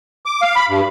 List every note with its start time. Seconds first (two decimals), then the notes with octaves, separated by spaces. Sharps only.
0.26 D6
0.42 F5
0.56 B5
0.69 G2